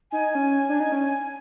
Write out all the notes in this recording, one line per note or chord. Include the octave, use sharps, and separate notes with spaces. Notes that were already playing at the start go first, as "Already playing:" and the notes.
D#4 G#5
C#4
D4
D#4
C#4